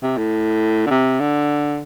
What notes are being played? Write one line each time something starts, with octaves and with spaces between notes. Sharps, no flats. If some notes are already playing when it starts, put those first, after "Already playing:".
C3
A2
D3
C3
D3